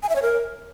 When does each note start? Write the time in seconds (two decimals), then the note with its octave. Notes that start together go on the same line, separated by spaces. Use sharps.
0.03 G#5
0.09 E5
0.16 C#5
0.22 A#4